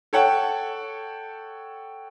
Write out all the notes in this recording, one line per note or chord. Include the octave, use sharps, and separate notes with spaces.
A4 C#5 F#5 G5 A5